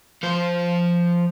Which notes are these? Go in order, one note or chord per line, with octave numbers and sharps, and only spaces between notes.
F3 C5